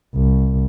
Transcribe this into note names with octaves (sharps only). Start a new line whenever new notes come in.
C2